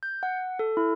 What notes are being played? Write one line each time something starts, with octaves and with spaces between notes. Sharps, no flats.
G6
F#5
A4
E4